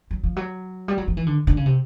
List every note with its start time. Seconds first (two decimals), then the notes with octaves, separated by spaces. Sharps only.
0.11 F#3
0.24 F3
0.36 F#3
0.88 G3
0.98 F#3
1.08 F3
1.17 E3
1.26 D3
1.47 D3
1.57 C#3
1.66 C3